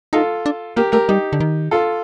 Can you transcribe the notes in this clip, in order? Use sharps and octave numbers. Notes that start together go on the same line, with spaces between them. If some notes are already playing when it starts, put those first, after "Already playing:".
D#4 F4 A4
D4
A#3 G4 A#4
A3 G4 A#4
G3 D#4 G4
D3
D#3
F4 A4